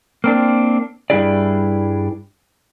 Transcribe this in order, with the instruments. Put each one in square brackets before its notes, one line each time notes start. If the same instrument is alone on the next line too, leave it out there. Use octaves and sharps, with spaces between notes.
[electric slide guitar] A#3 C4 D4
G2 G3 D4 E4 G#4 D5